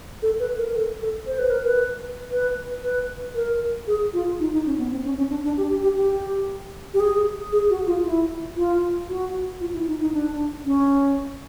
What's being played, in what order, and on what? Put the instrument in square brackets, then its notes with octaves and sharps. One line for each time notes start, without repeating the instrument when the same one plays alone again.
[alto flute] A4
B4
A#4
A4
A4
C5
B4
A#4
B4
B4
B4
A#4
G#4
F4
D#4
D#4
C#4
B3
C4
C#4
C#4
D4
D4
G4
G4
G4
G4
G4
G#4
G#4
F#4
F4
E4
F4
F#4
F4
E4
D#4
D#4
D4
C#4